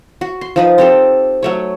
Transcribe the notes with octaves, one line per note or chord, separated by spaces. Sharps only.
F#4
C6
F3 D#4 B4
C4 G4 A4
F#3 A3 C#5